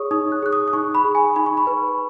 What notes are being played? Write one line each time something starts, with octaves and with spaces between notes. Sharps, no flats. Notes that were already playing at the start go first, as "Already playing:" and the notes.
Already playing: G#4 C#5 C#6 D#6
D#4 D#6
F#6
G#4 F#6
D#6
D#6
D#4 C#6
B5
G#4
G#5
D#4 B5
C#6
B5
B4